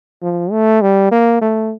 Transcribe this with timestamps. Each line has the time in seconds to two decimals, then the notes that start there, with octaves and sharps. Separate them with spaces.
0.22 F3
0.52 A3
0.82 G3
1.11 A#3
1.41 A3